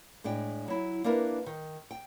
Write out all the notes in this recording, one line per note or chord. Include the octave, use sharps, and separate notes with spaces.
A2 G#3 D4 G5
F#3 E4
A#3 D4 E4 A#4 B4
D#3
G5